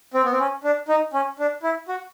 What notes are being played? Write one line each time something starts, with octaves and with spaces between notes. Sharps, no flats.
C4
B3
C4
C#4
D4
D#4
C#4
D4
E4
F#4